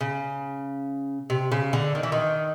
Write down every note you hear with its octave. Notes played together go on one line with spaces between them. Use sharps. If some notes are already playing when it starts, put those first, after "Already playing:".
C#3
C3
C#3
D3
D#3
E3
D#3